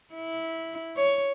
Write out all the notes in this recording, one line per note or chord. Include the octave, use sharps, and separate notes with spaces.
E4
C#5